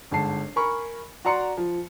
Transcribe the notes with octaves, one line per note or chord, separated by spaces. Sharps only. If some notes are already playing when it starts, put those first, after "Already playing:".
G1 G#2 A5 C7
A#4 G#5 B5 C#6
F#4 D5 A#5 C6 C#7
F3